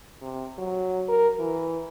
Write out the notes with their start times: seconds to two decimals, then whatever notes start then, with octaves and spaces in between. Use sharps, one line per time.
0.22 C3
0.58 F#3
1.09 A#4
1.39 E3